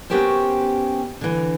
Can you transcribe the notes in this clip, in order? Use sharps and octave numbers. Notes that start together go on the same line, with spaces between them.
B3 C#4 F#4 G4 A#4 C5
D3 E3